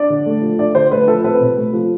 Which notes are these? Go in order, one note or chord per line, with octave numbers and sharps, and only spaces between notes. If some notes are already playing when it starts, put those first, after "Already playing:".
Already playing: D4 D5
D3
A3
F3
D4 D5
D3 C5
A3 B4
F3 A4
C4 B4
C3
A3
F3